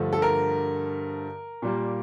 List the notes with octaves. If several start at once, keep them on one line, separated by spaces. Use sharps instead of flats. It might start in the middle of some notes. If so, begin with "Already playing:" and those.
Already playing: G2 D3 F3 A3
A4
A#4
A#2 G3 A#3